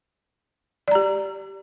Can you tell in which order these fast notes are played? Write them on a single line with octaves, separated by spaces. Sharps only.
D5 A#5 G4